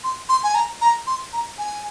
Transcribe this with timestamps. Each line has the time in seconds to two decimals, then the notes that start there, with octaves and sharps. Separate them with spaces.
0.04 C6
0.29 C6
0.43 G#5
0.55 A#5
0.81 A#5
1.07 C6
1.33 A#5
1.58 G#5